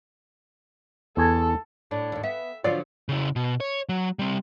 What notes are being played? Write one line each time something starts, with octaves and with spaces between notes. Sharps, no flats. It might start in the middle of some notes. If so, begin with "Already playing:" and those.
E2 A4 G#5
A2 D4
D#2 A2
B3 E5
D3 F3 F#3 F4 D5
C#3 E4
B2
C#5
F#3
G3 C4